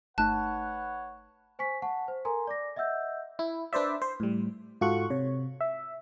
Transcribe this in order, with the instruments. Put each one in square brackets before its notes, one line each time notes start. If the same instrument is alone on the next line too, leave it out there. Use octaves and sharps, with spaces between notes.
[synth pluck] G1 A3 D#4 [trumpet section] B4 C#5 F#5 [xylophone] A5 F#6
[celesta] C5 G#5 C#6 B6
F#5 A5 C#6
C5
A4 A#4 G#5 A#5 C6
D5 D6 A#6
D#5 E5 F#5 E6 G6
[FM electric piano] E4
D4 B4 C5 D5 E5
C5
A2 G3
G#2 F4 F#4 A4 C#6 F#6
C3 C#5
E5